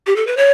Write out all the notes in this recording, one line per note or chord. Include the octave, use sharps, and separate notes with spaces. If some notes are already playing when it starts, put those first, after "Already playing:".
G4
A4
B4
C#5